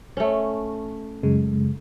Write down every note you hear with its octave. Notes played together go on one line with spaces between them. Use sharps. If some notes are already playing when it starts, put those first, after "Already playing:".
A3 C#4
F#2 C#3 G#3